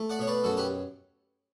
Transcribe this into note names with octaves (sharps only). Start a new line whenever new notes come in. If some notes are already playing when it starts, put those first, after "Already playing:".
Already playing: A3
D5 F#5
B2 C#5
B4 D5
F#2 F#4 A4
G4 B4